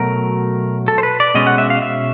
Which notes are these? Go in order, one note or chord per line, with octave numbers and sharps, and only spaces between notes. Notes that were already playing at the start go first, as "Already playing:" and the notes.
Already playing: B2 F#3 A3 A#4
A4
C5
B4
D5
B2 G#3 C#4 D#5
F#5
E5
F5
E5